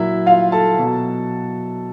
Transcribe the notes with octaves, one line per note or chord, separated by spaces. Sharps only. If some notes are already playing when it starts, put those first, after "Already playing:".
Already playing: A#2 F#3 E4 E5
F4 F5
A4 A5
B2 F#3